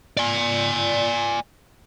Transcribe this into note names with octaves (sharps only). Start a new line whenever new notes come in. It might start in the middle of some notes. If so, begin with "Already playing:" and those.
D5 G#5